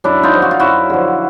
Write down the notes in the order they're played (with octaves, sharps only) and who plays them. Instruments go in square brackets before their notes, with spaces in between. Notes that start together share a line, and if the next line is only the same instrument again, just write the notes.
[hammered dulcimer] F#2 D4 E4
D#4 F4
D3 F3
F#4
F4
F#2 E4 F#4
D3 F3